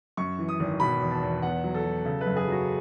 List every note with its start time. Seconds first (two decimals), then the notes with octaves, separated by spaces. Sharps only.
0.17 F#2 C#6
0.38 E3
0.48 D#6
0.60 G#1
0.80 B2 B5
1.00 E2
1.11 A5
1.22 E2
1.42 B3 F#5
1.64 F#3
1.74 A4
1.85 F#3
2.05 C#3 A4
2.21 B4
2.27 F#2
2.36 G#4
2.48 F#3 F#4